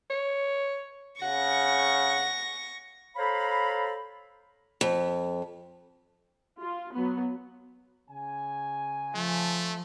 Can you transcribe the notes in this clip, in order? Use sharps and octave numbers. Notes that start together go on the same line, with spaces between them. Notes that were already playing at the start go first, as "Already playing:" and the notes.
C#5
C#3 F#5 C#6 A#6
A4 C5 C#5 F5 A#5 B5
F2
F4
F#3 B3
C#3 G#5
F3 A3